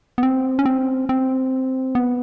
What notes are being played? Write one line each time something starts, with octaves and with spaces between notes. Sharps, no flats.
B3
C4
C#4
C4
C4
B3